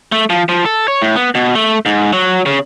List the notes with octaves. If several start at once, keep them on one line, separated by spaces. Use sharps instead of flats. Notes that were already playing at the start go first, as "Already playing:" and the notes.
A3
F3
F3
A4
C#5
A2
B3
B2
A3
G#2
F#3
C#3